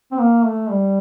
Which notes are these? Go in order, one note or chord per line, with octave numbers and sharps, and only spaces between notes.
C4
A#3
A3
G3